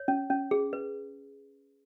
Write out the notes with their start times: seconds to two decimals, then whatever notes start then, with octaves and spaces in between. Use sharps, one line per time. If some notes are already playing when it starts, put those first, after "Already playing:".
Already playing: C#5
0.08 C#4
0.30 C#4
0.51 G#4
0.73 B4